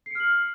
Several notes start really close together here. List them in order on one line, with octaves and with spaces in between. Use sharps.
C7 C#7 F6 F#7